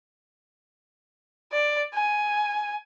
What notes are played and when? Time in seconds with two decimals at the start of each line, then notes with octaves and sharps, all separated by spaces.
1.52 D5
1.94 G#5